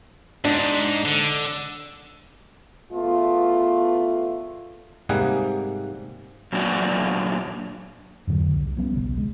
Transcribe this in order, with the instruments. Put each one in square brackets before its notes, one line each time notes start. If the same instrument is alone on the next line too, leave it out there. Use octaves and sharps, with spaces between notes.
[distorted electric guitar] G#2 [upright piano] D4
[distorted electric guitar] D3
[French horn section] E2 A3 B3 F4
[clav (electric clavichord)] G#2 C3 G3 A#3 G#4 F#5
[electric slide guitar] F#2 A#2 F#3 D4 F#4
[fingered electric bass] F2 G#2 D3 F#3
C2
F3 G3 B3 C#4
D#1 B1 C#3
G#3